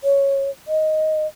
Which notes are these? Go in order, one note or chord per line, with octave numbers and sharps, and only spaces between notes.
C#5
D#5